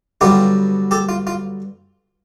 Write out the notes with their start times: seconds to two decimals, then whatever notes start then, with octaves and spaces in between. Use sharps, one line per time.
0.21 G2 D3 F#3 B3 F4 G4
0.91 G4 A4
1.09 F4
1.27 F4